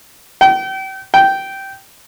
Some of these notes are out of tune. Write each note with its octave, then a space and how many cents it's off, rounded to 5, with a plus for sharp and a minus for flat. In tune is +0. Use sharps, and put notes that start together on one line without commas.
G5 -35
G5 -10